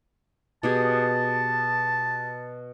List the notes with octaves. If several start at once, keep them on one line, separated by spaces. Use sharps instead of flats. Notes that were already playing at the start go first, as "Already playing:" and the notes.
B2 G4 G#4 A5